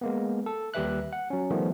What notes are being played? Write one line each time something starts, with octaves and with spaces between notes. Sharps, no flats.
G#3 A#3 B3
A4
D#2 G3 G4 B4 E5 F#6
F#5
F#3 C#4
D#3 F3 G3 A3 B3